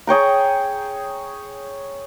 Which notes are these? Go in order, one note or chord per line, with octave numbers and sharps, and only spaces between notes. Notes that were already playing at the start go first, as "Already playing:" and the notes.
G#4 C#5 G5 A#5